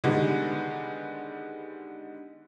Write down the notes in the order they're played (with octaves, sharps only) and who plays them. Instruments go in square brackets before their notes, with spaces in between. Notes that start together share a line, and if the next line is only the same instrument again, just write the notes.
[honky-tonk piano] D3 D#3 G3 G#3 B3